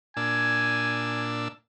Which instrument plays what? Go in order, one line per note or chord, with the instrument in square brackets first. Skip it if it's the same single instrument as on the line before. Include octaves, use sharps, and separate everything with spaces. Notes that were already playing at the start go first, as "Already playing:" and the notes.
[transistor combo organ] A#2 D4 E6 [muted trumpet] G#5